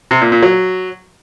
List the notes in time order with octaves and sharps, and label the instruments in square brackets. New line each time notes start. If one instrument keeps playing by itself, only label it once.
[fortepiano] C3
A#2
A#2
F#3